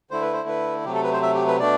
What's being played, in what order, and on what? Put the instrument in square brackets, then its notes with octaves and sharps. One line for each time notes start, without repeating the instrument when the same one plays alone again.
[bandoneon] D3 A3 E4 C5
B4
C5
B4
C3 F#3 A3 G4
A4
B4
C5
E5
G4
B4
B2 A3 D4 D5